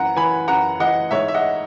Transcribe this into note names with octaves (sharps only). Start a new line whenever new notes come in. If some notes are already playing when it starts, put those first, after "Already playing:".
Already playing: F#2 E3 F#5 A#5
E3 G#5 B5
F#2 F#5 A#5
E3 D#5 F#5
G#2 C#5 E5
E5
D#5 F#5